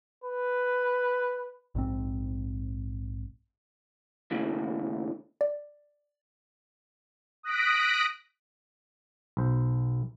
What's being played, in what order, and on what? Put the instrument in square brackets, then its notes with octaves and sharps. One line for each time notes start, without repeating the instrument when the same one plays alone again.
[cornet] B4
[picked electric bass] A#1 G#2 C4
[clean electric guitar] D#2 A2 C#3
[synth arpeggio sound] D5
[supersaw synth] D#6 F#6 A#6 B6 D7
[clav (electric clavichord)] B1 C5